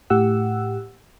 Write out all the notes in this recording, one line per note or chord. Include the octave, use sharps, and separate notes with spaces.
A2 G4 F#5 E6